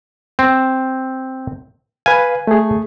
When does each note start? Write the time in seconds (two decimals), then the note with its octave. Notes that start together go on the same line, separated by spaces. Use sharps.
0.39 C4
2.06 B4 F5 G#5
2.47 A3 G#4